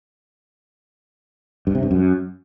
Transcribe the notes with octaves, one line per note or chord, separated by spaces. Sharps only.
G2
C3
G2
F#2